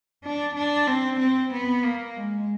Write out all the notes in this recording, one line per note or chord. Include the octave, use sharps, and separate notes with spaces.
D4
D4
C4
C4
B3
A#3
G#3